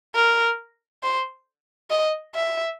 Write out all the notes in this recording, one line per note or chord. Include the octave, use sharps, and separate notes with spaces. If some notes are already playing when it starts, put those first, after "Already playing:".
A#4
C5
D#5
E5